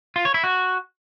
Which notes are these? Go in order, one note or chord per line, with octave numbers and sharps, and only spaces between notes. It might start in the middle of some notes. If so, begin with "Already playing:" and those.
F4
C#5
E4
F#4